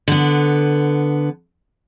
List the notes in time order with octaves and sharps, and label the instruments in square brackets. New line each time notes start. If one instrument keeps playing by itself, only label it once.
[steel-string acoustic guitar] D3 B3